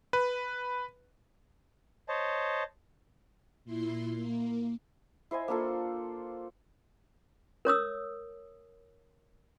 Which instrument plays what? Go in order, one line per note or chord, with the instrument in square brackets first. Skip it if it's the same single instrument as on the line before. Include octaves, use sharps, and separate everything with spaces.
[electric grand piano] B4
[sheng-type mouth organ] C5 C#5 D#5 A5
[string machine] A#2 E4 C6
A#3
[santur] E4 C5 D#5 G#5
A#3 D4 F4 A4
[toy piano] A#4 C#5 D#6 E6